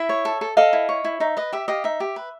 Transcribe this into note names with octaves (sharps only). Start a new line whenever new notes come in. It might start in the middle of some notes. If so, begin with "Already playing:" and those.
Already playing: E4 E5
C#5
A4
A4
A4 D#5 F5
E4
C#5
E4
D#4 E5
B4 D#5
G4 E5
G4 D#5 F5
D#4 E5
G4
B4